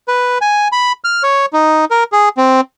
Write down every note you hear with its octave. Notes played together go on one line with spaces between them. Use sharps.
B4
G#5
B5
F6
C#5
D#4
A#4
G#4
C4